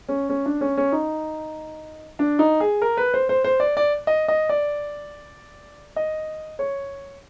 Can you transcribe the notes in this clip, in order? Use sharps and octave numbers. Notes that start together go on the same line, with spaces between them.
C#4
C#4
D4
C#4
C#4
D#4
D4
D#4
G#4
A#4
B4
C5
C5
C5
D5
D5
D#5
D#5
D5
D#5
C#5